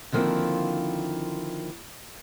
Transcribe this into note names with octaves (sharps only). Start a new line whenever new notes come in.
D3 D#3 F3 A#3 C4 E4